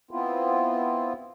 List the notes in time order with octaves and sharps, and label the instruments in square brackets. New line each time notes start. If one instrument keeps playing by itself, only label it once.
[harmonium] B3 C4 E4 F4